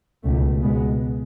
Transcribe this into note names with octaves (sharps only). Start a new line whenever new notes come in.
C#2 B2 A3
B2 G#3 B3